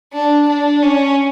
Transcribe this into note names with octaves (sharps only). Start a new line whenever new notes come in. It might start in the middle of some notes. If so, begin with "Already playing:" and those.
D4
D4
C#4